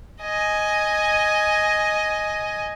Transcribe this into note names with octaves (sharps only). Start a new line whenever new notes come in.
D#5 G#5